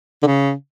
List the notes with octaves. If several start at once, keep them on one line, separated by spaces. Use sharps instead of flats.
D3
C#3